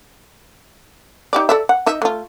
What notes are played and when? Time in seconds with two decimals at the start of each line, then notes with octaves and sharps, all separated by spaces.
1.33 D#4 G4 D5
1.49 A4 D5 E5
1.69 F#5
1.86 D#4 D#5 E5
2.02 A3 F4